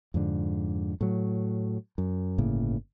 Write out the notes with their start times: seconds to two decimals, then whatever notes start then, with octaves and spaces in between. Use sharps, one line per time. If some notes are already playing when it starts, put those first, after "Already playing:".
0.14 F2 G#2 D3
1.01 A2 F#3
1.98 F#2
2.38 G1 A2 C#3 A#3